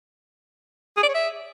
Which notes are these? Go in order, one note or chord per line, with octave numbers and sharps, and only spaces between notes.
G#4
D5
C#5
E5